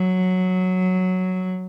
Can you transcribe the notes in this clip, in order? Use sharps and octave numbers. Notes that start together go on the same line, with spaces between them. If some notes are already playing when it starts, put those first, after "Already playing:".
Already playing: F#3